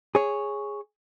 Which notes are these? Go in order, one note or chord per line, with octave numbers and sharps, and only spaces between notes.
G#4 C#5